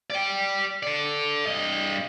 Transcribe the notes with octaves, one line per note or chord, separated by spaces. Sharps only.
D5 G5
A4 D5
G2 D#5